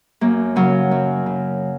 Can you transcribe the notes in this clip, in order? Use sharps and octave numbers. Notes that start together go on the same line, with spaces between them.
F#2 A#3
C#3 F#3
F#2
C#3